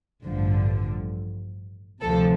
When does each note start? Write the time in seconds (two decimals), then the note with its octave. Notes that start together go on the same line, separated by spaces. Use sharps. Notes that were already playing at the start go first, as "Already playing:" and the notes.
0.25 A1 G2 D3 F3
2.02 D2 C3 F3 A4